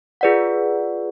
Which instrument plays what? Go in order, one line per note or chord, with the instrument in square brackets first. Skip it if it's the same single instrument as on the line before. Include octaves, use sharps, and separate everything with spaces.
[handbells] F4 G#4 B4 D5 F#5